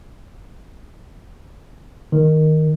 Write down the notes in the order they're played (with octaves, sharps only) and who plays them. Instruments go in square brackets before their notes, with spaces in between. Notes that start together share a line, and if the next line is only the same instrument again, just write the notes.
[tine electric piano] D#3